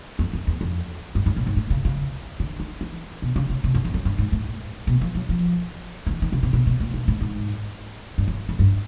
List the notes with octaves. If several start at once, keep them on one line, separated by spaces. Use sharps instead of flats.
F2
F2
E2
F2
G2
G#2
A#2
G#2
A2
C#3
C#3
D3
D#3
E3
B2
C#3
C#3
C3
F#2
F2
F#2
G2
G#2
A2
B2
F3
F#3
F3
F3
E3
D#3
C#3
C3
B2
B2
A#2
A#2
A2
G#2
G2
F#2
F2
G2